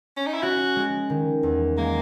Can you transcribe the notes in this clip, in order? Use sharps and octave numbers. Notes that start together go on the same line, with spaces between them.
C#4
D#4
E4
C#4 F#4
G#3
D#3
E2
G#3 A#3